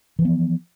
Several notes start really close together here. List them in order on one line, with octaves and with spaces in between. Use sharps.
E3 F3 B3